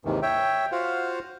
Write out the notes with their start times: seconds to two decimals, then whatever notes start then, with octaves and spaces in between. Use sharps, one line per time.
0.05 D#2 G#2 C3 D#3 E3
0.22 C#5 E5 G5
0.72 F4 F#4 C5 F5 F#5